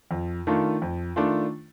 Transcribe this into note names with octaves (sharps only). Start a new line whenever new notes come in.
F2
D#3 A3 D4 F4
F2
D#3 A3 D4 F4